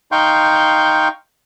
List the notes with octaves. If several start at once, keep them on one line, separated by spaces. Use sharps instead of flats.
D#4 F5 G5 C6 C#6 G6